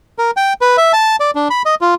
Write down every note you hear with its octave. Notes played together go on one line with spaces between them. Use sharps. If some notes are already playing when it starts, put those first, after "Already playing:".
A#4
G5
B4
E5
A5
D5
D4
B5
D#5
F4